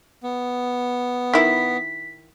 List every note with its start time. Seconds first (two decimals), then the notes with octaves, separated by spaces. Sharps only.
0.23 B3
1.34 D#3 E4 B6